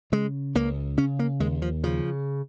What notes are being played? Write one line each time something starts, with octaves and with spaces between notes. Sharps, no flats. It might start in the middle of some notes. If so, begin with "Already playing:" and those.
C#3 G#3
C#2 A#3
C#3 C#4
A#3
D#2 G#3
F3
C#3 F3